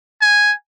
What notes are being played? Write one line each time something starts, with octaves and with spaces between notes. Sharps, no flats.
G#5